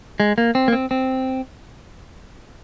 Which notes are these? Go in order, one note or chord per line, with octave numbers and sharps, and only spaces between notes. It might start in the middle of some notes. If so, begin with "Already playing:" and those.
G#3
A#3
C4
A#3
C4
C4